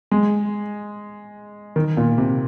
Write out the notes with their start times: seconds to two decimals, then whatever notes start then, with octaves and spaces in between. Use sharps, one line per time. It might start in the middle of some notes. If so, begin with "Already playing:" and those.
0.11 G#3
1.76 D#3
1.97 A#2
2.18 C3